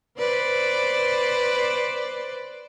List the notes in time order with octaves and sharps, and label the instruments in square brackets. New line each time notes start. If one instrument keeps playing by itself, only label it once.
[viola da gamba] B4 C5 D5